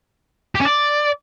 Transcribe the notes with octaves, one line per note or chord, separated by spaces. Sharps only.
G4
C#4
D5